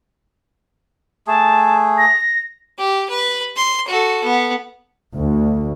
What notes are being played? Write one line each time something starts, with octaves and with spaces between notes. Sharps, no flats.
A3 G#4 A5
A#6
G4
B4
C6
F#4 A4
B3
D2